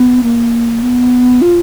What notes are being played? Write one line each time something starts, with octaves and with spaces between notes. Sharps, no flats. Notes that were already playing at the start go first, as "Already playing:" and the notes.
Already playing: B3
A#3
B3
F4